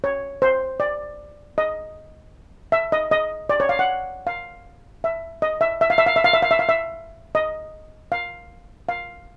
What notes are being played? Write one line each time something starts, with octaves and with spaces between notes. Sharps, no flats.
C#5
C5
D5
D#5
E5
D#5
D#5
D5
C#5
F5
F#5
F5
E5
D#5
E5
E5
F5
E5
F5
E5
F5
E5
F5
E5
F5
E5
D#5
F5
F5